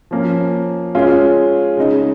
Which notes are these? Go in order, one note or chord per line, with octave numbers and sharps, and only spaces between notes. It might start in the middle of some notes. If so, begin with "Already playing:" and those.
F3 A#3 C#4
G#3 C#4 F4 G#4
C#3 G#3 D#4